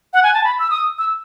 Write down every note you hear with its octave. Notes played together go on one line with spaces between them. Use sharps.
F#5
G#5
A5
B5
E6
D#6
E6